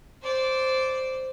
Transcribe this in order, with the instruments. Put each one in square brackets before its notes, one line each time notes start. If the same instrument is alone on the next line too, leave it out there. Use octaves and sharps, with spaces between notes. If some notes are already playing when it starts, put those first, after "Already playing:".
[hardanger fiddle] C5 D5